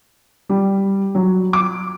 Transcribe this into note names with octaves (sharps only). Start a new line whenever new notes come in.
G3
F#3
D6